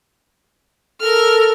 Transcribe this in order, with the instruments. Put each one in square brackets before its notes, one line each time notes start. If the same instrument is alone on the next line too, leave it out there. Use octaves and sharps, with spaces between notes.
[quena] A4 [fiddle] A#4 F6